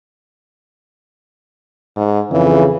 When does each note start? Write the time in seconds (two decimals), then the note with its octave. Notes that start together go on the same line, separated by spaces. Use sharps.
1.96 G#2
2.31 F2 C#3 E3